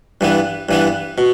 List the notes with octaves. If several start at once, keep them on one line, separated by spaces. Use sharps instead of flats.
G2 E3 B3
G2 E3 B3
B2